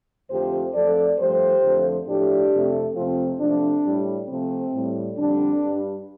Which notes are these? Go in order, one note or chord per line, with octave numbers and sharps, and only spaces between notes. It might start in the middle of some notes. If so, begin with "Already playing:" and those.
F2 D3 F3 A3 G4 C5
F2 F3 A3 A4 D5
G2 F3 A3 G4 C5
F2 D3 F3 A3
A2 F3 A3 D4 G4
F2 C3 A3
F2 C3 F3 A3 C4 F4
C3 F3 A3 D4
A2 G3
C3 F3 A3 C4
A2 G3
F2 D3 G3 D4
G2 G3